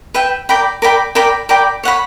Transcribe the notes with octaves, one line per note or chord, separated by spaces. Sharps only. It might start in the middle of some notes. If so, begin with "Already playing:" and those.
B4 E5 G5
A#4 D5 G5 B5
A#4 D5 G5 B5
A#4 D5 G5 B5
A#4 D5 G5 B5
C#5 F#5 B5